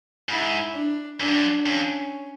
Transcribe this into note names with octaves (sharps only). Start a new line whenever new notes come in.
G#2 E4
D4
F#2 D4
G2
F#2
F2 C#4